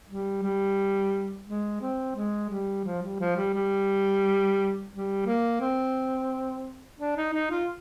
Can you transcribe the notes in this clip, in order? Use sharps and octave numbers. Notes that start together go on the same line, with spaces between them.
G3
G3
G#3
C4
G#3
G3
F3
G3
F3
G3
G3
G3
A#3
C4
D4
D#4
D#4
F4